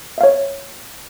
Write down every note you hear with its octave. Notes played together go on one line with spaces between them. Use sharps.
C#5 E5 F5